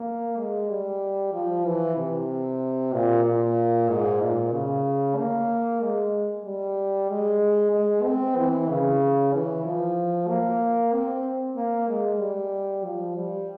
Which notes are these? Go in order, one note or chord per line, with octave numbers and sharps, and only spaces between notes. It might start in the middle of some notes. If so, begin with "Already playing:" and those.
Already playing: A#3
G#3
G3
F3
E3
C3
A#2
A#2
G#2
A#2
C#3
A#3
G#3
G3
G#3
G#3
C4
E3
C#3
E3
F3
A#3
C4
A#3
G#3
G3
F3
G3